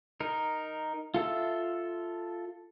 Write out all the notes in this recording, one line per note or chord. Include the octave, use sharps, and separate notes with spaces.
D#4 A#4
F4 A4 E5 E6